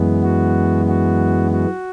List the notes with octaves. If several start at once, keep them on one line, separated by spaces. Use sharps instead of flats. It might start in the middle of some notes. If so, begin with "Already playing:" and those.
Already playing: F#2 E3 G#3 B3
F#4
F#4
F#4